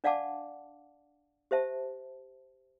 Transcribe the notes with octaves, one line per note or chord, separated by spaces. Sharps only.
D4 D5 F5 F#5 A5 D6
G4 C5 E5 A5